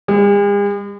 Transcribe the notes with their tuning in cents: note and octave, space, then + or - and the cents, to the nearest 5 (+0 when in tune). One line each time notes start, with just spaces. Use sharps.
G#3 -45